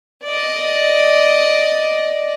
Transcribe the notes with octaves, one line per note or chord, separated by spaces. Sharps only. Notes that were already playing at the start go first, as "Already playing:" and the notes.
D5 D#5